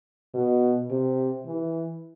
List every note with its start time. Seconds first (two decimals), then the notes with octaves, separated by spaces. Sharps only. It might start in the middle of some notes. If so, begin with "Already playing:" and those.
0.34 B2
0.91 C3
1.46 E3